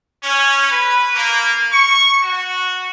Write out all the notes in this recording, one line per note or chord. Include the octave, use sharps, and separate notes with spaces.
C#4
B4
A#3
C#6
F#4